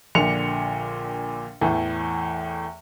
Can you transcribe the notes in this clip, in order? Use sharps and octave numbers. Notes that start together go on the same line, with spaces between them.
A#1 A#2 D3 D4 C#7 F7
E2 A2 E3